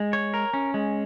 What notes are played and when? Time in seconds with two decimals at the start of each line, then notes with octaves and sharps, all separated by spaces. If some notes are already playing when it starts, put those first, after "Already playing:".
Already playing: G#3
0.13 C#5
0.34 A#4
0.53 C#4
0.74 G#3